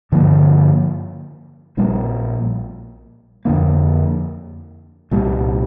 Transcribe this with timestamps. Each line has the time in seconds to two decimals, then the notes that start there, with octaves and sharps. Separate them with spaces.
0.12 G2 D3 F3 A#3
1.77 A#1 A#2 G3 A#3
3.45 F2 D3 A#3
5.11 C2 A#2 G3